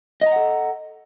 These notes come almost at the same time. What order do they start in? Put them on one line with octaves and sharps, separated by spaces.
D#5 A#5 F#5 A4